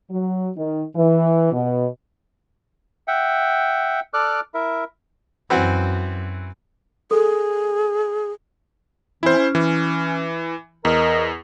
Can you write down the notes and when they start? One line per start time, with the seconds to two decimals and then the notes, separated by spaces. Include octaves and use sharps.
0.11 F#3
0.57 D#3
0.96 E3
1.53 B2
3.08 E5 F#5 G5
4.14 A4 D5 D6 F6 F#6
4.54 E4 A#4 E5
5.50 F#2 E3 C4 F#4
7.11 G#4 A4
9.23 E3 C4 C#4 E4 C5
9.36 C#4
9.55 E3
10.85 E2 A#4 D#5